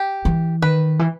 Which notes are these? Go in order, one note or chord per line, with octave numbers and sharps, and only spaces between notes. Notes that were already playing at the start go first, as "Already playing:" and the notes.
Already playing: G4
E3
D#3 B4
E3